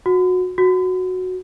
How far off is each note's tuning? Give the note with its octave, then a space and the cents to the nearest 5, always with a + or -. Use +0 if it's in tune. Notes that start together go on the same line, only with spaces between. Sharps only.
F#4 -20
F#4 -5